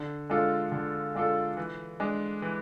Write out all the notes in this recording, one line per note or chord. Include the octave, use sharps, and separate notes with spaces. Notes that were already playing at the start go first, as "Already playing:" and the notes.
Already playing: D3
G#3 D4 F4 A4
D3
G#3 D4 F4 A4
E3
G#3 D4
E3